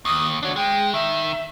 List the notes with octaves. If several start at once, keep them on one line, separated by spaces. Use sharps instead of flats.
D#2 D#6
D4 F#4 C#5
G#3 G5
D#3 E5